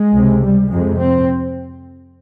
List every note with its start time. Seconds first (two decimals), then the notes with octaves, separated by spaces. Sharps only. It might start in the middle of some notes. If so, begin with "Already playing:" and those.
Already playing: G#3
0.12 C#2 C3
0.42 G3
0.70 F2 C3 G#3
0.98 C4